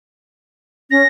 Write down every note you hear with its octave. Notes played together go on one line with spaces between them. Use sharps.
C#4 A#6